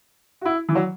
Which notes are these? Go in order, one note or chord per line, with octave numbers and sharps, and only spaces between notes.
F#4
E4
E3
F#3